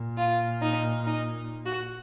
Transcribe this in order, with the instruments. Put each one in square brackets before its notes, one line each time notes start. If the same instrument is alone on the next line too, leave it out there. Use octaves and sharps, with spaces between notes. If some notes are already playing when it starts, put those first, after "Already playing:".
Already playing: [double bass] A#2
[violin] F4
D#4
D#4
F#4